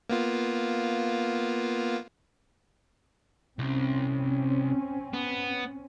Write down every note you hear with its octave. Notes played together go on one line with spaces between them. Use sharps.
A#3 B3 F4
C2 C4 C#4
B3